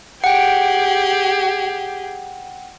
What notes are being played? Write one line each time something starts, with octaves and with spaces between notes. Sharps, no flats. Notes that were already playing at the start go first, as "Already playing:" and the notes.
G4 G#4 F#5 G5